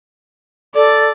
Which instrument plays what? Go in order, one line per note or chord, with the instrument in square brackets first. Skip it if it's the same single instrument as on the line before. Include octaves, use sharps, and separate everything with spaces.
[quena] A4 [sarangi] D5